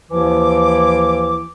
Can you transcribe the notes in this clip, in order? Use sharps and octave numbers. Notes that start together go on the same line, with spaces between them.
D#2 E3 F3 E4 D6